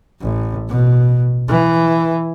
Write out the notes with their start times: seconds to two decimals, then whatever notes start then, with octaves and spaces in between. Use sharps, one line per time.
0.21 A1
0.69 B2
1.48 E3